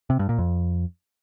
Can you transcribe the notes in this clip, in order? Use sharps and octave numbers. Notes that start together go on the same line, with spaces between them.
C3
G2
A#2
F2